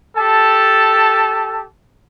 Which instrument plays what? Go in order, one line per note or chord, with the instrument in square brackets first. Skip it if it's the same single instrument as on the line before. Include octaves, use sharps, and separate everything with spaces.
[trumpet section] G4 A4 A5